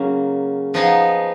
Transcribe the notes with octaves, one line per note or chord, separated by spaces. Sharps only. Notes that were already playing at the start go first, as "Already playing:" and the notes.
Already playing: C#3 F#3 A#3 C#4
F3 B3 D#4 G#4